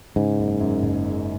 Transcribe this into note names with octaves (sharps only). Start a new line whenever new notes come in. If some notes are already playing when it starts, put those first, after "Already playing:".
G#2 C#3
F#1
F#2
F#1
C#3